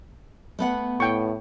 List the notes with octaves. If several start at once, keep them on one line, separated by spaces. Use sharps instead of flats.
A3 B3 F#5
A2 G5 C#6